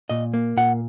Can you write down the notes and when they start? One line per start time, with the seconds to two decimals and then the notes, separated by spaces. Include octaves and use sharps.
0.09 A#2 D#5
0.34 A#3
0.57 A#2 F#5